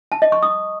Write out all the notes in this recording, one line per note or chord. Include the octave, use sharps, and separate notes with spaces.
A5
D#5
C#6
D#6